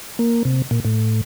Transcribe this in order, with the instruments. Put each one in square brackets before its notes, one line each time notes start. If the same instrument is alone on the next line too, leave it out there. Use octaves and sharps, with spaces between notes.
[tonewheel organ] A#3
C3
A#2
A2